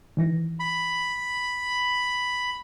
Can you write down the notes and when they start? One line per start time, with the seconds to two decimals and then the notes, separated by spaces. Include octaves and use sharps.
0.17 D#3 E3 A#6
0.60 B5